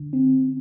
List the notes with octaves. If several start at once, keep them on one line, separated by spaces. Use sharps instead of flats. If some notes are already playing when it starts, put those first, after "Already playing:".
Already playing: D3
C4